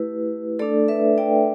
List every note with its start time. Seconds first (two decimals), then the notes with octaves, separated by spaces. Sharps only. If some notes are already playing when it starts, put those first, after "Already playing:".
Already playing: A3 E4 G4 B4
0.59 A3 D4 A4 D5
0.88 B4 E5
1.18 D5 G5